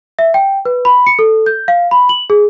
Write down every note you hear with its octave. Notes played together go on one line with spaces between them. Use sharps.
E5
G5
B4
B5
C#7
A4
G6
F5
B5
F#7
G#4